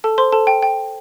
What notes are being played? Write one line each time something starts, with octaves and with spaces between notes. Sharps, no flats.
A4 A5
C5 C6
A4 A5
G5
G5